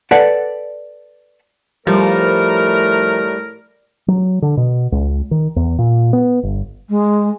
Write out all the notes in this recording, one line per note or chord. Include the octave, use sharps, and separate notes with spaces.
A4 B4 D5 F#5 A5
A2 F3 G3 A3 A#4
F#3
D3
B2
C#2
D#3
E2
A#2
B3
G1
G#3